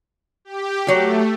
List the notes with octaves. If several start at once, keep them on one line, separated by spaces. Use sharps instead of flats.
G4
F#3 A3 G4